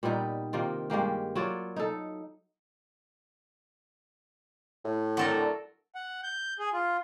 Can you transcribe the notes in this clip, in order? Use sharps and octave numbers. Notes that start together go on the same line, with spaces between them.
A#2 G3 B3 D#4
C3 D#3 A#3 F4
G2 G#3 A#3 G4
F#3 F4 C#5 D5
D#4 A4
A2
D3 F#3 C4 A4 A#4 F#5 C6 D6
F#5
G6
G#4
F4